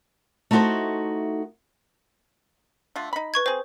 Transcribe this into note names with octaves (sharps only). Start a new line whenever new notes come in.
A3 D#4 E4 F#4 A4 C5
D3 A3 F4
D#4 B5
B4 C#6 G#6
C4 G#4 C5